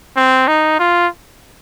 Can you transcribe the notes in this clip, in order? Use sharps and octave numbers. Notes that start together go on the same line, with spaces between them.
C4
D#4
F4